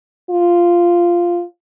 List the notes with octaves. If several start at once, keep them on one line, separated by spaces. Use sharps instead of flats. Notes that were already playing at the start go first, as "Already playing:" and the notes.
F4